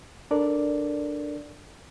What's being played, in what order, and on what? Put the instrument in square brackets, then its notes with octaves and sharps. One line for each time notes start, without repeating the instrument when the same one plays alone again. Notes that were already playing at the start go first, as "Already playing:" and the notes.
[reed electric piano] D4 A4 A#4 D5